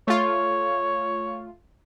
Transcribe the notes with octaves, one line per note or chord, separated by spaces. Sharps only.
A3 F4 C#5